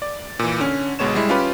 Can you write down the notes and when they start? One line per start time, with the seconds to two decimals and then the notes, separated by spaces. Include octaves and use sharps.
0.02 D5
0.39 A#2 E3
0.60 D3 C#4
0.99 G1 B2 G#3 B3 C#5 E7
1.15 G3 G#3 E4
1.29 C#4 F4 G4 B4